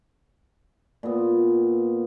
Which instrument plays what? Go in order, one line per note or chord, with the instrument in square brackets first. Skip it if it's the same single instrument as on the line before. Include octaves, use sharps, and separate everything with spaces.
[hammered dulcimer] A#2 B3